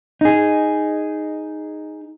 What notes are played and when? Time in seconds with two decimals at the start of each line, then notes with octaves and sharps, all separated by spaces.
0.21 D#4 G#4